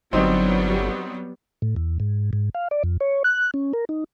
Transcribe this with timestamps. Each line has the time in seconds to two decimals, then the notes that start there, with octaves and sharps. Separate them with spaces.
0.13 G1 F#3 G3 B3 C4 D#4
1.62 A2
1.76 E2
2.00 G#2
2.33 G#2
2.55 F5
2.71 D5
2.84 F2
3.00 C#5
3.24 F#6
3.54 C#4
3.73 A#4
3.89 D#4